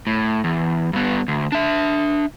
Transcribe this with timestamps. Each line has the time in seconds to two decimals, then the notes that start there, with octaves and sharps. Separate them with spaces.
0.07 A2
0.44 E2
0.93 G2 B3
1.28 D2
1.52 D4 E5